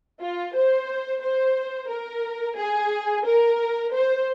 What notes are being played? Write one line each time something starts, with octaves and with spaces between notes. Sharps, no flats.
F4
C5
C5
A#4
G#4
A#4
C5